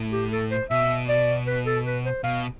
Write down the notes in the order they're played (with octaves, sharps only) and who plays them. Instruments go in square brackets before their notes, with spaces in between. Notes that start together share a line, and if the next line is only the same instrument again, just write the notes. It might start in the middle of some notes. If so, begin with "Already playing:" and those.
Already playing: [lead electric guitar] A2
[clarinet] G4
A4
C5
[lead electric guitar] B2 [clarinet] E5
[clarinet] D5
B4
A4
B4
C5
[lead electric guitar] B2 [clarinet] F5